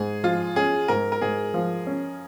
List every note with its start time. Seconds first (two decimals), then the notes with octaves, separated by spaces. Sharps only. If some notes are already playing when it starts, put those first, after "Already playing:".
Already playing: G#2 G#4
0.23 F3 F4
0.56 C#4 G#4
0.88 G#2 A#4
1.12 A#4
1.21 G#2 G#4
1.54 F3
1.87 C#4